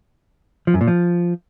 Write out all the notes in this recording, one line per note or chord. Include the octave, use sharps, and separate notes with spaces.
F3
F#2
A#2
F3